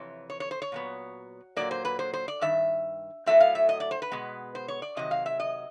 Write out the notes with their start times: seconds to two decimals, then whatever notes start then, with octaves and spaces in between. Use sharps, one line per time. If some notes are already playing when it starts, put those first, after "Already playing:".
Already playing: F2 C3 E3 C#5
0.30 C#5
0.40 C#5
0.51 C5
0.62 C#5
0.72 A#2 F#3 B3
1.57 A#2 F#3 A#3 D5
1.71 C5
1.85 B4
1.99 C5
2.13 C5
2.28 D5
2.41 G2 D#3 E5
3.26 A2 F#3 A3 C4 E5
3.40 F5
3.55 E5
3.69 D#5
3.80 D5
3.91 C5
4.02 B4
4.12 B2 G#3 B3
4.55 C5
4.68 C#5
4.82 D5
4.97 C3 D#3 F#3 D#5
5.11 F5
5.26 E5
5.40 D#5